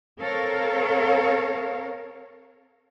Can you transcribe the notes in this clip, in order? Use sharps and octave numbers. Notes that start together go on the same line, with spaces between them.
C4 A4 A#4 C#5 F5